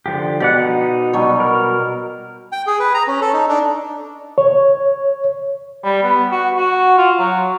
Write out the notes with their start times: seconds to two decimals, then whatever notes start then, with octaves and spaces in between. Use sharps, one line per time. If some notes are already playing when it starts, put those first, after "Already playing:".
0.06 D3 F3 G4
0.40 B2 G4 D5 F#5
0.60 D#4
1.13 B2 F#3 G3
1.40 A#4
2.52 G5
2.67 G#4
2.79 B4
2.94 A#5
3.07 C#4
3.21 A4
3.33 D#4
3.49 D4
4.38 C#5
5.84 G3
6.03 B3
6.32 F#4
6.57 F#4
6.98 F4
7.20 F#3